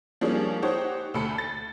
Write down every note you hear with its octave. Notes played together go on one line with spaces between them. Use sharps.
F3 G3 G#3 A#3 C#4 D4
D#4 G4 C5 C#5 F#5
D2 A3 A5 B5 C#7
A6